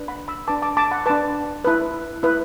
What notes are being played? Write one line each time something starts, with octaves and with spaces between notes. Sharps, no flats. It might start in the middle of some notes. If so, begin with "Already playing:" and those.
Already playing: D4 B4
F#5 B5
B5 E6
D4 B4 A5 D6
A5 D6
A5 D6
F#5 B5
D4 B4 A5 D6
E4 B4
E4 B4